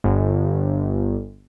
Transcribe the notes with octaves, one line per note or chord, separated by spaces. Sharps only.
G1